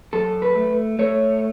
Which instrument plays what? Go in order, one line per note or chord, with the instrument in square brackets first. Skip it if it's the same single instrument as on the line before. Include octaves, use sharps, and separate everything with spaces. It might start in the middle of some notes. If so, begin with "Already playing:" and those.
[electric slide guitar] F#2 A4
B4
A3
A3 C#5